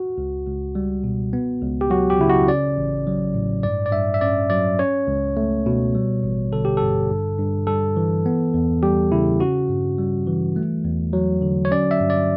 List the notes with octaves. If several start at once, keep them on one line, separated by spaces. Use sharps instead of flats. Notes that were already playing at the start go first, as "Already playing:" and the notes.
Already playing: F#4
C#2
C#2
G3
B2
B3
C#2
G4
F#3 F#4
G4
C#3 E4
F#4
C#4 D5
A1
F#3
A2
G2 D5
D5
G2 E5
E5
C#4 D5
F#3 D5
C#4 C#5
C#2
A3
B2
G3
A1
D3 A4
G4
G2 A4
G2
G2
G3 A4
E3
B3
E2
G3 G4
C#3 E4
C#4 F#4
G2
G3
E3
A3
E2
F#3
D3
C#5
C#4 D5
E5
G2
D5